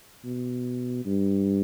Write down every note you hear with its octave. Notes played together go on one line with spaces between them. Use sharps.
B2
G2